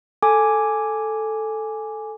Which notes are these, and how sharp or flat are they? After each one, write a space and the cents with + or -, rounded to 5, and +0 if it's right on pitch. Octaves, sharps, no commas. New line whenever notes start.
A4 +0 G#5 +0 D6 +0